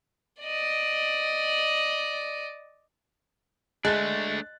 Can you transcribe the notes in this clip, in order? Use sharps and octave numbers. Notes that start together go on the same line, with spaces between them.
D5 D#5
G#3 A3 D4 F#6 A6